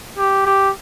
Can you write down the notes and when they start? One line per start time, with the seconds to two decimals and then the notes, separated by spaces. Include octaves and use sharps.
0.18 G4
0.46 G4